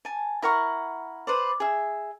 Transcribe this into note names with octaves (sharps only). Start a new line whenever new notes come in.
G#5 A5
E4 A#4 F#5 C#6
B4 C5 D5
G#4 E5